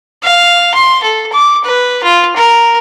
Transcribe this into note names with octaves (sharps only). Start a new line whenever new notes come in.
F5
C6
A4
D6
B4
F4
A#4